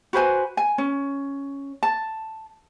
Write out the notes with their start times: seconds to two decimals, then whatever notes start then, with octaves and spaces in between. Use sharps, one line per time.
0.13 F#4 B4 C5 G#5
0.57 G#5
0.78 C#4
1.83 A5